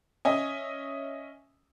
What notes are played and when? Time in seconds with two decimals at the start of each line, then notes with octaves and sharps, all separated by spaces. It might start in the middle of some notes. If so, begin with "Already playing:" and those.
0.25 C#4 D#5 E5 G#5